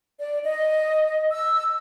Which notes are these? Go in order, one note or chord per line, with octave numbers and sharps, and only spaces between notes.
D5
D#5
E6